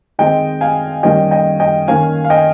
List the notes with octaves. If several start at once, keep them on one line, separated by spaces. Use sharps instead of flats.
D#3 G#3 C4 D#5 G5
F5 G#5
D#3 G3 A#3 C#4 D#5 G5
D#5 G5
D#5 G5
D#3 A#3 C#4 F5 G#5
F5
D#5 G5